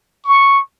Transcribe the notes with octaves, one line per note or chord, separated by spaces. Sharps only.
C#6